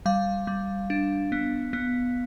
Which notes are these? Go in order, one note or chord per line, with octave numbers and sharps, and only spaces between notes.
G3 F5
G3
D4
B3
B3